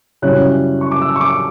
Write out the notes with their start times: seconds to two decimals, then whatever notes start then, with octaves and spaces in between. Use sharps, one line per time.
0.22 F#2 C#3 G3 C#4 E4 F#6
0.81 C#6
0.91 D6
1.02 E6
1.16 C#6
1.21 D6